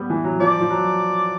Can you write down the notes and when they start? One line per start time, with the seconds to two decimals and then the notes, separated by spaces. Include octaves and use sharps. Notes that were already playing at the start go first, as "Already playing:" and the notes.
Already playing: G3 B3
0.10 E3
0.24 F#3
0.40 F3 D5
0.61 F3
0.70 F#3